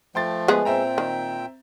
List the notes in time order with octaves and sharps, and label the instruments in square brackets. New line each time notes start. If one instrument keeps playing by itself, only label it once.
[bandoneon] F3 A3 [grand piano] G5 C6 A6
[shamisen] G#3 B3 G#4
[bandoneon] A#2 G5 [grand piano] C4 E5 A#5
[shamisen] D#3